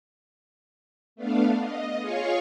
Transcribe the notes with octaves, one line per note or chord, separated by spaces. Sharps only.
A3 B3 D4 F5
D#5
F4 G#4 C#5 F5 C#6